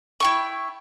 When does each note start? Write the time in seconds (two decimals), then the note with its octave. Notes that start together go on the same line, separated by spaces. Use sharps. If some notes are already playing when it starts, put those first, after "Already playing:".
0.20 E4 G5 C#6